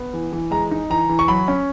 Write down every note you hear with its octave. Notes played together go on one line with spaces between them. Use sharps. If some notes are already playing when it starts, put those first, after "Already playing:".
Already playing: B3
E3
E3
G#3 A#5
D#4
E3 A#5
E3
C#6
F#3 B5
C#4